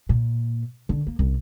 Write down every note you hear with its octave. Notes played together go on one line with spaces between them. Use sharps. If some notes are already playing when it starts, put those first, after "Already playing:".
A#2
D3
A#3
C2